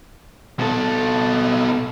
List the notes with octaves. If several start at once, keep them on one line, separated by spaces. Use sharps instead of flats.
B2 A4